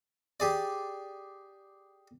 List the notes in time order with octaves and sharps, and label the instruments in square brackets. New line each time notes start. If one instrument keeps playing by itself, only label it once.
[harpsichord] G4 G#4 D5